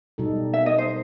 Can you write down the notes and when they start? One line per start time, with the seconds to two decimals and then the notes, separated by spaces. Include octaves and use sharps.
0.18 B2 G3 D#4 A4
0.53 E5
0.66 D#5
0.78 C5